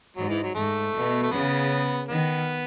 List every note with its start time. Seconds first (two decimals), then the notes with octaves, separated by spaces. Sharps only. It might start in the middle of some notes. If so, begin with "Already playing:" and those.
0.17 G#2 F#3
0.29 E3
0.42 F#3
0.55 G#2 A3
0.94 B2
1.23 A3
1.31 C#3 B3
2.09 D#3 B3